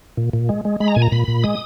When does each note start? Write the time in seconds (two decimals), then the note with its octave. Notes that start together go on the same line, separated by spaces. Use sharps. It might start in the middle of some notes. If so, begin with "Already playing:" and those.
0.17 A#2
0.33 A#2
0.49 G#3
0.65 G#3
0.80 G#3 B5
0.88 A#5
0.95 A#2 G#5
1.02 A#5
1.12 A#2 B5
1.28 A#2
1.43 G#3 D#6